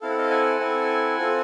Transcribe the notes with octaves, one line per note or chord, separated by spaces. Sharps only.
C4 E4 A4 F5
F#5
D#5 F5
F#5 G#5
C4 E4 A4
C4 F4 A4